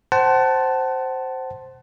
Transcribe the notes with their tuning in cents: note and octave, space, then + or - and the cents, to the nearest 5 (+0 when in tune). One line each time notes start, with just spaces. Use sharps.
C5 +0 F#5 +35 A5 +0